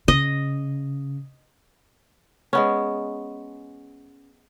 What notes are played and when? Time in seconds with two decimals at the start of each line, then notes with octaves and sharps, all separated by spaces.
0.08 C#3 D#5
2.53 G#3 B3 C#4